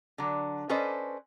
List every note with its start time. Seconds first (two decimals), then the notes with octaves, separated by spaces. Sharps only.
0.18 D3 F#3
0.69 C#4 A4 B4 C5 D5 D#5